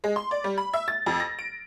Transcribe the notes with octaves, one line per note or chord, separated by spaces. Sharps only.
G#3
C6
D5
G3
B5
E5
A6
F2
A#6
D7